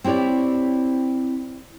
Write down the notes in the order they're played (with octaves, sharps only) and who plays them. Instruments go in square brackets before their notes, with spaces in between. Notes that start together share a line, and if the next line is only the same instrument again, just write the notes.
[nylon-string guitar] C4 E4 G4 C#5 D5